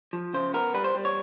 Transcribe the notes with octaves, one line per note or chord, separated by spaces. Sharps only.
F3
C#3 C5
B3 A#4
G3 B4
C5
G3
C#5